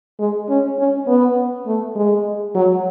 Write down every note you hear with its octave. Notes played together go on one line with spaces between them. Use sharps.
G#3
C#4
C#4
B3
A3
G#3
F#3